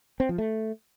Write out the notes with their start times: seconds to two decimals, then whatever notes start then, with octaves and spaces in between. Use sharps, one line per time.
0.20 C4
0.29 F3
0.38 A3